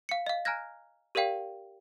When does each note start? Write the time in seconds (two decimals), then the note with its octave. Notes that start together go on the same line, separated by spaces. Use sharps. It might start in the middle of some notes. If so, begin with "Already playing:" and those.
0.09 F5 C#7
0.27 D#5 F5
0.45 G#5 A#5 F6 F#6 G#6 A#6
1.15 G4 A#4 D5 F5 G5